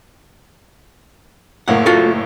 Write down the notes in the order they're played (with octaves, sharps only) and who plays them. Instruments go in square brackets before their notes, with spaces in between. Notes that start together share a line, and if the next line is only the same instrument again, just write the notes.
[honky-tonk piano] F#1 A2 A#3 [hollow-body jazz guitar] F#5
[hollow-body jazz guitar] F4 F#4 A4